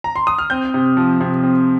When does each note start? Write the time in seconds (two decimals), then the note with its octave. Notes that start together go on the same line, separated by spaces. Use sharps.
0.04 A#5
0.16 C6
0.27 D#6
0.38 F6
0.50 C4 G6
0.74 C3
0.97 F3
1.21 C3
1.43 C4